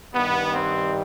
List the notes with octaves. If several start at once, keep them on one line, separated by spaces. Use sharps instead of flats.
G2 D#3 G3 B3
C4